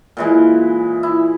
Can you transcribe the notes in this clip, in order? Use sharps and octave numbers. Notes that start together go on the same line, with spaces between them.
A#2 E3 G#3
E4